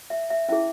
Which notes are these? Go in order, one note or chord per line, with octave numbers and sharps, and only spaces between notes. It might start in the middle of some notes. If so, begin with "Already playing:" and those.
E5
E5
C#4 E4 G#4 E5